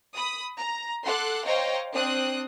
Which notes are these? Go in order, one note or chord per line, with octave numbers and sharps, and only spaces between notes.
B5 D#6
A#5
A4 F#5 C6 D6 F#6
C5 C#5 D#5 F5 G5 A#5
C4 D4 D#6 F#6